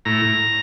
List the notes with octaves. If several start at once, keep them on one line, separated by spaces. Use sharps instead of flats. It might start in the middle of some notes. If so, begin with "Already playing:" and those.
A2 A#5